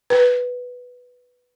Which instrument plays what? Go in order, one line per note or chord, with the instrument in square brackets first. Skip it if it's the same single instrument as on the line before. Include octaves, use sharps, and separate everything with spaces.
[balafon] B4